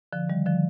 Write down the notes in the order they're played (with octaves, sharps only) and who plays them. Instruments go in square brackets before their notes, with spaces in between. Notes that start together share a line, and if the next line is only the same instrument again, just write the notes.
[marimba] D3 F3
D#3 G3
D3 F3